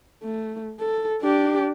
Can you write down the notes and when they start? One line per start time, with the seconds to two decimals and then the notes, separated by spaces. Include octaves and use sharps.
0.24 A3
0.80 A4
1.22 D4 G4